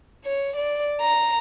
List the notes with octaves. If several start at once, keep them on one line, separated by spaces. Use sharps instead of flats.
C#5
D5
A#5